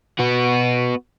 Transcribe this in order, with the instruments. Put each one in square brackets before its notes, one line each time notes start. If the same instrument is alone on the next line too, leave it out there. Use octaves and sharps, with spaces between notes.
[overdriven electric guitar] B3 F#4